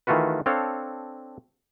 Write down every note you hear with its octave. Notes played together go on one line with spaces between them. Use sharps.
D#3 E3 A3 F4 F#4 B4
C4 D4 A4 C#5 F5